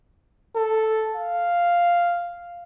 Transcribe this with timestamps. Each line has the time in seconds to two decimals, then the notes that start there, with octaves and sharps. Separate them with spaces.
0.56 A4
1.15 F5